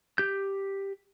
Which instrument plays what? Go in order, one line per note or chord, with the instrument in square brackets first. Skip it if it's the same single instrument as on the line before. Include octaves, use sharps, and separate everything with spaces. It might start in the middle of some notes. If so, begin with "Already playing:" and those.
[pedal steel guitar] G4 G6